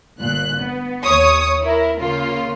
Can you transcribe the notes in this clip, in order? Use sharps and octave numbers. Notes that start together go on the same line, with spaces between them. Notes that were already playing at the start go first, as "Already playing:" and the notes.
G1 A#2 F#6
B3
D#2 C#5 C#6 D#6
E4 A#4
C#3 A#3 F4